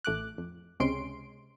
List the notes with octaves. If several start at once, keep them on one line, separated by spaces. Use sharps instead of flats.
A1 A3 D6 F#6
F2
C#2 C3 G#3 C#4 C6 D7